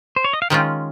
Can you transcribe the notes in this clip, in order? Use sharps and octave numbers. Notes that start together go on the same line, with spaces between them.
C5
C#5
D#5
F5
D#3 G#3 C#4 F4 G5